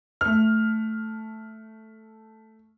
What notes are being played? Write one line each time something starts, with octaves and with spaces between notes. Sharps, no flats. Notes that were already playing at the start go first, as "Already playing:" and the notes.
A3 F6